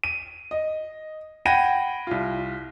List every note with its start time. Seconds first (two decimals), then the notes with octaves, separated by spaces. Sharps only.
0.04 D#7
0.51 D#5
1.45 F#5 G5 B5 G#6 A#6 D#7
2.07 C2 F4